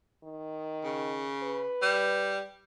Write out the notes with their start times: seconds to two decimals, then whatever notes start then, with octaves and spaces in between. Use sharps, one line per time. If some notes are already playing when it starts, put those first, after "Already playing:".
0.24 D#3
0.84 C#3
1.43 B4
1.82 G3